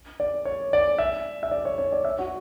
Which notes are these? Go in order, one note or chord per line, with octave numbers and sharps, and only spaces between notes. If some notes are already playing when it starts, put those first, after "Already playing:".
D5
C#5
D5
E5
E5
D5
C#5
C#5
D5
E5
F#4